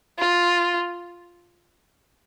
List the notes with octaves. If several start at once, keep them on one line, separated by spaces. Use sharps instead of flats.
F4